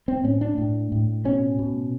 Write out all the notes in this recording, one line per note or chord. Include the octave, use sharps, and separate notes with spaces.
C4
A2 C#4
D4
A2
A2
B2 C#4
B2